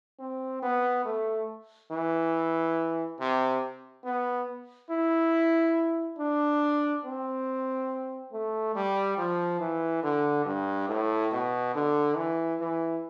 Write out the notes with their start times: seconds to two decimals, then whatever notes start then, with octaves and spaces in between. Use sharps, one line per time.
0.19 C4
0.62 B3
1.05 A3
1.91 E3
3.20 C3
4.04 B3
4.90 E4
6.18 D4
7.04 C4
8.33 A3
8.76 G3
9.18 F3
9.60 E3
10.03 D3
10.45 G2
10.88 A2
11.32 B2
11.75 D3
12.16 E3
12.60 E3